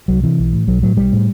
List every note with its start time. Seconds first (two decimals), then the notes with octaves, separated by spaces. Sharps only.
0.08 C2 F#3
0.23 C3 E3
0.39 B1
0.53 A2
0.67 B1 F#3
0.82 A2 F#3
0.97 B1 G3
1.12 A2